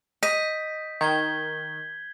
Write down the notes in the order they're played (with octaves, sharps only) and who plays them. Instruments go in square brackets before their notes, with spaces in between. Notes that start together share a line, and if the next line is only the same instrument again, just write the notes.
[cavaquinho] D#5 [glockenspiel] G6 B6
[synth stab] D#3 [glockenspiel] G6 G#6 G7